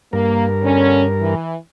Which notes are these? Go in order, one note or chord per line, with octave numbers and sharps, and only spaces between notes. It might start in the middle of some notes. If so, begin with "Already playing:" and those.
G2 A#3 A#4
D3 B3 C#4
E3